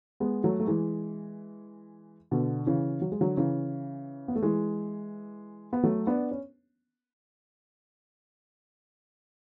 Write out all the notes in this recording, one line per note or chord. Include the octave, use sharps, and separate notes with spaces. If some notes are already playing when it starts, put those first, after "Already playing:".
G#3 B3
F#3 A3
A3
E3 G#3
B2 D3
C#3 E3
F#3
G#3
D3 F#3
C#3 E3
B3
A3
E3 G#3
B3
F#3 A3
B3 D4
C#4